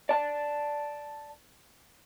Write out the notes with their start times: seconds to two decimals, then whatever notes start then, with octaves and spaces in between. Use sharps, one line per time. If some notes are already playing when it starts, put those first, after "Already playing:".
0.09 D5 A5